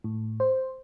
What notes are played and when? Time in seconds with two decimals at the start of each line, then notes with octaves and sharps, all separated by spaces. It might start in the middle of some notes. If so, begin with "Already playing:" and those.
0.04 A2
0.40 C5